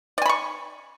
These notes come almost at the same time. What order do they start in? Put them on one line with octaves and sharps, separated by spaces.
D5 G#5 B5 C#6